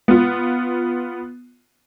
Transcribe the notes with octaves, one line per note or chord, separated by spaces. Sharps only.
B3 F4